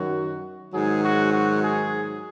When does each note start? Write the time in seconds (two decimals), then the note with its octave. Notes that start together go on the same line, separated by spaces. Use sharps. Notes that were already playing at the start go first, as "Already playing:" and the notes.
Already playing: F#2 D#3 F#3 F#4
0.74 G#2 D#3 F#3 G#4
1.03 F#4
1.32 F#4
1.62 G#4